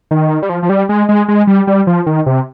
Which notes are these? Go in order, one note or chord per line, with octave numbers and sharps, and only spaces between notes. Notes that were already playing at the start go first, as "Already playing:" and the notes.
D#3
G3
F3
F3
G3
G#3
G#3
G#3
G3
G3
F3
D#3
C3